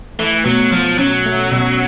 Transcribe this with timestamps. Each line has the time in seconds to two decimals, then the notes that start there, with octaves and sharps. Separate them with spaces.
0.19 E3 A3
0.45 B2 F#3
0.72 F3 F#3
0.98 F#3 C#4
1.26 A3
1.52 B2